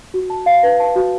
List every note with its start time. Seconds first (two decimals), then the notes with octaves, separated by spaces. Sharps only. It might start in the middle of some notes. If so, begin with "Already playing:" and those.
0.14 F#4
0.30 A5
0.46 F5
0.63 B4
0.80 A5
0.96 F#4